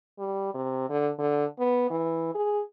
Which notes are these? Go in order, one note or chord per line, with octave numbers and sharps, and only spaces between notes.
G3
C3
D3
D3
B3
E3
G#4